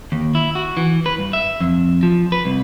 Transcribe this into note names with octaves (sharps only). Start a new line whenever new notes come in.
D#2
E4
F#4
E3
B4
G2
E5
F2
F3
B4
C2